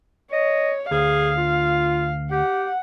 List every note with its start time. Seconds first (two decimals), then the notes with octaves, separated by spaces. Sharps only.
0.32 C#5 D#5
0.91 D2 G#4 F5
1.37 F4
2.31 G4 F#5